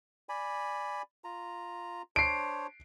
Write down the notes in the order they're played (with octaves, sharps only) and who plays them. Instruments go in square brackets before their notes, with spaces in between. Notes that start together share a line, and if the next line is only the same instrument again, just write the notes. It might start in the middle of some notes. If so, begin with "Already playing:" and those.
[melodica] D5 G#5 B5
F4 A#5
[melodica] D4 C5 C#5 [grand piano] C7 D7